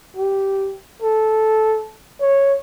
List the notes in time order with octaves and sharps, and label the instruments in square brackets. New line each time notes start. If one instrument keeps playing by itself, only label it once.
[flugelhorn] G4
A4
C#5